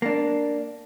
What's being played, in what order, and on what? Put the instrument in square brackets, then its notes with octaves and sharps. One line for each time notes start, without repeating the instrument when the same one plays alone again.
[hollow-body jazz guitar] A#3 D4